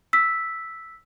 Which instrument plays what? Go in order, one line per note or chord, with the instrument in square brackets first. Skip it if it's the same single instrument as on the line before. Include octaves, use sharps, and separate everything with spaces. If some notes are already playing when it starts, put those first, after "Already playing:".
[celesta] E6 B6